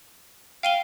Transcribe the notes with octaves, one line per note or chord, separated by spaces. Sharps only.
F5 G5 D#7 G7